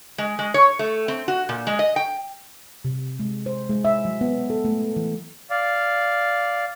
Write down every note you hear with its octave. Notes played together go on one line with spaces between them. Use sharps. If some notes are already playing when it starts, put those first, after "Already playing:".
G#3
G#3
C#5
A3
C4
F#4
A#2
G#3
D#5
G5
C3
G#3
C5
G#3
E5
F#3
B3
A4
A3
E3
D5 F5